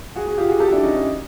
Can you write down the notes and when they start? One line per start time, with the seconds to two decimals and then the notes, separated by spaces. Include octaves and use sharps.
0.16 F#4 G#4
0.27 F#4 G#4
0.38 F4 G4
0.49 F#4 G#4
0.60 G4 A4
0.71 D4 E4
0.83 C#4 D#4
0.94 C#4 D#4